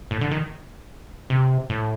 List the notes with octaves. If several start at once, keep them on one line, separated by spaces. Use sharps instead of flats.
A2
D3
D#3
C3
A2